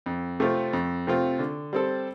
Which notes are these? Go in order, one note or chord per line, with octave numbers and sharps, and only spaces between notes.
F2
C3 A3 C4 F4
F2
C3 A3 C4 F4
D3
G3 C4 A4